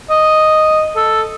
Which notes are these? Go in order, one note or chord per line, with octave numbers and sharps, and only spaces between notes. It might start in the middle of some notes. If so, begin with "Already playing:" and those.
D#5
A4